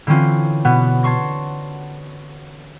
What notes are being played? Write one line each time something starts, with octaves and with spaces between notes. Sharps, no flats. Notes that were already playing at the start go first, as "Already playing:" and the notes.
D3 E3 C4 C#4 F4
B2 B3 F#5
C#5 A5 C6 C#6 A#6